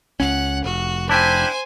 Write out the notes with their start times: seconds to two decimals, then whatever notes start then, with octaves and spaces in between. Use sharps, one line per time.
0.20 C#2 C#4 F#5
0.64 F1 F#4
1.09 D4 E4 G4 C5 G#5